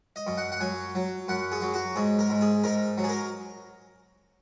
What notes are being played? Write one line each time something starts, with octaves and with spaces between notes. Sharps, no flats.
D#5
F#2
F#5
F#5
F#3 G#5
F#3
F#2 F#5
G#4
F#3
F#4
G#2 G#4
A#4
G#2
G#4
G#2 A#4
F#3
G#4
A#4